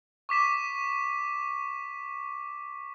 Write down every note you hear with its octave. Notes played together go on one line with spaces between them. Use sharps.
C#6 D6 B6 E7